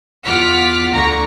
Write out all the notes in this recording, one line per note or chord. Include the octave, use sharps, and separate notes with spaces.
E2 F4 F#5 D6 F6 B6
D2 D3 A#5 C#6 A#6